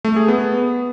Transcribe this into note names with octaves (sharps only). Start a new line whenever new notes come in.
A3
G#4
B3